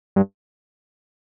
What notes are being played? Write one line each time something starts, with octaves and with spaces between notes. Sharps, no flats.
G2